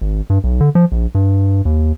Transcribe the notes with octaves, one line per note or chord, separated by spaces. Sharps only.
G#1
G2
B1
D3
F3
A#1
G2
D#2